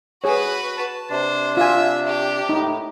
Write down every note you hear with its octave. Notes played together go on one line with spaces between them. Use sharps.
F#4 G#4 B4 C#5
A5
C3 D4 C5
F4 E5 G#5
G4
A2 D#4